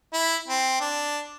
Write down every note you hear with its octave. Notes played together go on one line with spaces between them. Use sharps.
E4
C4
D4